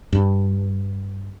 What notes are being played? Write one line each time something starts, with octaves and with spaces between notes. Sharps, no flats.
G2